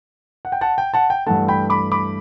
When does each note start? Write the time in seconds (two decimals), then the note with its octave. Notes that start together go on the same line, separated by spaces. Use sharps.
0.45 F#5
0.52 G5
0.61 F#5 A5
0.78 G5
0.94 F#5 A5
1.10 G5
1.26 G2 E3 A3 F#5 A5
1.48 G5 B5
1.70 B5 D6
1.92 B5 D6